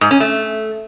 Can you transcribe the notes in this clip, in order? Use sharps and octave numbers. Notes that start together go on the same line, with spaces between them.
G#2
C#4
A3